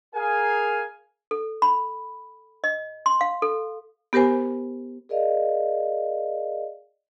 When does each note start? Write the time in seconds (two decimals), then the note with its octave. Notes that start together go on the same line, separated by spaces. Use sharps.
0.16 G#4 A#4 F5 G#5
1.31 A4
1.62 B5
2.64 D#5
3.06 C6
3.21 F5
3.42 A4
4.13 B3 G4 A#4 C5 G#5
5.09 G#4 A#4 D5 D#5 F5